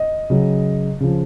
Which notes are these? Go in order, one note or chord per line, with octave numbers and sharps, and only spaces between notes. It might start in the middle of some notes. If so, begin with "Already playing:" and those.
Already playing: D#5
C#3 F#3
C#3 F3